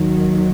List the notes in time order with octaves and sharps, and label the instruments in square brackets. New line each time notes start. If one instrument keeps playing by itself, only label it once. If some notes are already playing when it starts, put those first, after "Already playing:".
Already playing: [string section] D#2 D#3 F#3